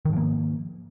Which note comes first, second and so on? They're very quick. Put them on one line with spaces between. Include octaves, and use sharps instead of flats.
D#3 G#2 F3 A#3